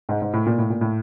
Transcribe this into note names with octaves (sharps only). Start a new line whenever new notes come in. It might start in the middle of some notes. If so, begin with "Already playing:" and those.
G#2
G#2
A2
A#2
A2
A#2
A2